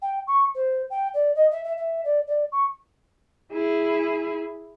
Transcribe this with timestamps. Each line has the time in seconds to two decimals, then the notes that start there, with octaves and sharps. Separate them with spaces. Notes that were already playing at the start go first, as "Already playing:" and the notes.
0.02 G5
0.27 C#6
0.55 C5
0.90 G5
1.14 D5
1.36 D#5
1.51 E5
1.64 E5
1.77 E5
2.05 D5
2.27 D5
2.52 C#6
3.52 E4 G#4